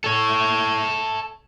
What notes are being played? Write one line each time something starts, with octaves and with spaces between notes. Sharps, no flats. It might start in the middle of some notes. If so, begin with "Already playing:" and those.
A4 C#5